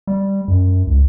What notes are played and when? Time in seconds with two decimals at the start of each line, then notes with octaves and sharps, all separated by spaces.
0.07 G3
0.48 F#2
0.87 C#2